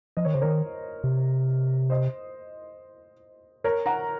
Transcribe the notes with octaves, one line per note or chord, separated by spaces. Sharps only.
F3 D#5
D#3 C#5
C#3 C5
D#3 A#4 C#5
C3
C5 D#5
A#4 C#5
F#5 A#5